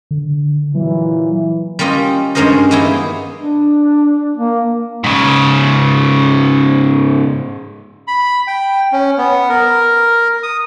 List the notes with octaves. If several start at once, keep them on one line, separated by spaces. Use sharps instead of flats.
D3
A#2 E3 F#3
G3 A#3 C#4 F4 D#5
G2 G#3 C#4 A#4 C5 D#5
A#3 B3 D#4 E4 G#4
D4
A#3
G#2 C#3
B5
G5
C#4
B3
A#4
D#6